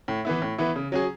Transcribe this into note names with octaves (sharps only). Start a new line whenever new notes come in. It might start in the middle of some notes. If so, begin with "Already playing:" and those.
A2
E3 B3 E4
A2
E3 B3 E4
C#3
F#3 C#4 G#4